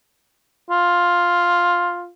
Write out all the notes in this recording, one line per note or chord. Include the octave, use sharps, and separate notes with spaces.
F4